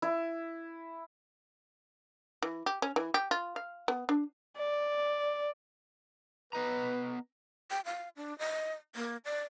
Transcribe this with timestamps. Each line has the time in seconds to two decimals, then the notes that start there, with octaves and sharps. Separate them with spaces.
0.02 E4
2.42 E3
2.66 G4
2.82 C#4
2.96 E3
3.14 G4
3.31 F4
3.56 F5
3.88 B3
4.09 D4
4.57 D5
6.53 B3 B4 D#5 A#5
7.71 G5
7.85 F5
8.17 D4
8.39 D#5
8.96 A#3
9.25 D5